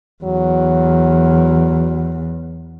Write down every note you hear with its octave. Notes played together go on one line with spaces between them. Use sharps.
E2 F#3